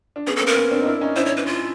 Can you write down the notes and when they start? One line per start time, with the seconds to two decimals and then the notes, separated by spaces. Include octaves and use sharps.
0.16 D4
0.27 B3 C#4 G#4
0.36 A4
0.41 A#3 C4
0.47 A#4
0.56 B3 C#4
0.71 C4 D4
0.82 D#4
0.86 D4 E4
1.01 C#4 D#4
1.16 D4 E4 C5
1.26 C#5
1.37 B4
1.46 F4